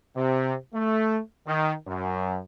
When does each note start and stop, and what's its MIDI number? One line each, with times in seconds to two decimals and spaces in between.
0.16 0.54 48
0.74 1.19 57
1.47 1.73 51
1.88 2.39 42